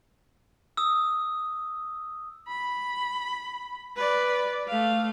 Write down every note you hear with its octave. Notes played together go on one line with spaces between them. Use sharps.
D#6 E6
B5
B4 D5
A3 F5